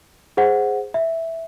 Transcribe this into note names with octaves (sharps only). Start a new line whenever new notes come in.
G#4 C5 F#5
E5